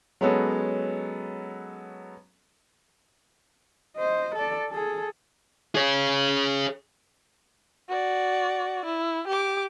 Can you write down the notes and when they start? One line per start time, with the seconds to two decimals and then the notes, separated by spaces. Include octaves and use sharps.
0.21 F#3 G#3 B3 C#4 A4
3.97 C5 D#5
4.35 A4 D5
4.70 G#4 A4
5.75 G#4 C#5
7.89 F#4 D5
8.85 E4
9.28 G4 D6